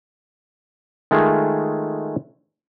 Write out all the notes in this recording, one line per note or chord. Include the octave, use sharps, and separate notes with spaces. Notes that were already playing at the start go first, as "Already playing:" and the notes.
D#3 G#3 A3 F4 G#4